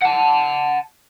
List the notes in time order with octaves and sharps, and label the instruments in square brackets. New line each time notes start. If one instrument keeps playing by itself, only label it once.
[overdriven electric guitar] F#5 A5